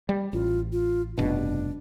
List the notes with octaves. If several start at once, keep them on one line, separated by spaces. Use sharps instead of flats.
G3
A1 F4
F4
F1 G2 B2 D4